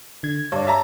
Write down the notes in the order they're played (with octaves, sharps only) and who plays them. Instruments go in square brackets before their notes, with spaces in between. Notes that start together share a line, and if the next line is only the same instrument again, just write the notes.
[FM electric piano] D3 G#6
[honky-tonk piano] G2 [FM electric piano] C#5 D5
[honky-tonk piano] E5 A5 A#5